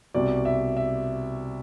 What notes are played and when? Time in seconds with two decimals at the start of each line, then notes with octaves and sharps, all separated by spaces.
0.14 C2 B2 D5
0.45 E5
0.77 E5